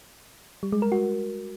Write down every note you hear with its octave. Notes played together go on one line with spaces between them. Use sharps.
G3
G#3
A#4
F#4